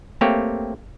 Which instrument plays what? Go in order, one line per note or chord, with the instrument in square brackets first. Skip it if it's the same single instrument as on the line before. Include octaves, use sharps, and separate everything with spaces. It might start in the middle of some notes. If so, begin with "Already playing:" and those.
[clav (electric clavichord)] A3 A#3 C4 G4 C#5